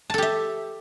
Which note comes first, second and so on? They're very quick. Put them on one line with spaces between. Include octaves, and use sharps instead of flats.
A5 A4 G4 E5